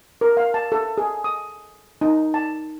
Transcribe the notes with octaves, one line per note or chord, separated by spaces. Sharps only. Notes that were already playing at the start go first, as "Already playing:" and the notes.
A#4
F5
A5
A4
G#4
D#6
D#4
A5